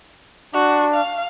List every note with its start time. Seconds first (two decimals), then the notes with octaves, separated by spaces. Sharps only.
0.54 D4 F#4
0.94 F5